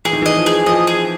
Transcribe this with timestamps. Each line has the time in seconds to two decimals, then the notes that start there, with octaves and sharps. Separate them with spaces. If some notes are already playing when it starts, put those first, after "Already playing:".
0.05 E3 G#4
0.13 D#3
0.22 E3 D#5
0.37 F3
0.46 G#4
0.66 F3 D#5
0.87 G#4